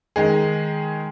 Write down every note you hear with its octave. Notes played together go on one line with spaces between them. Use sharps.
D#3 G#3 G#4